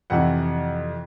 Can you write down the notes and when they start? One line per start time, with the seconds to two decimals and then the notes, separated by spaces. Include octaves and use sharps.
0.10 F2 C3 E3 F#5